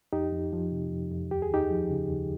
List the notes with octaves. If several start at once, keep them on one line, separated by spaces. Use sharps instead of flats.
F2 D#4 G4
F2
F3
C3
F2
F2
D#2 G4
G#4
D#2 D#4 G4
F3
C#3
D#2